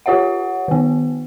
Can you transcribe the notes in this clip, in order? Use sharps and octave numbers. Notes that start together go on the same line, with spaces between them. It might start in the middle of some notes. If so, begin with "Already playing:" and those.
F4 G4 C#5 E5 F#5
D#3 B3